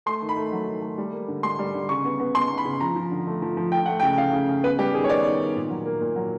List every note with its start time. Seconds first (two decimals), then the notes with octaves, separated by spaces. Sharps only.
0.06 A3 C6
0.22 D#3
0.29 B5
0.37 A3
0.52 F#3
0.67 D#3
0.82 A3
0.98 G3
1.13 A#3
1.28 D3
1.43 G3 C6
1.59 G3
1.74 D3
1.89 C#3 C#6
2.05 B3
2.20 B3
2.35 B3 C6
2.50 B3
2.58 B5
2.65 C#3
2.80 F3 A#5
2.96 F3
3.11 D3
3.27 A3
3.42 F3
3.57 F3
3.72 A3 G5
3.86 A3 F#5
4.00 G5
4.03 C#3
4.18 C#3 F5
4.33 C#3
4.49 C#3
4.64 B3 B4
4.79 G3 G4
4.94 D#3 G#4
5.04 C#5
5.09 B3 D5
5.25 D#3
5.39 D#3
5.56 A#2
5.70 F#3
5.86 A#3
6.01 A#2
6.16 F#3